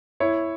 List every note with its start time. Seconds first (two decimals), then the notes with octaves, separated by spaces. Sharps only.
0.20 E4 C#5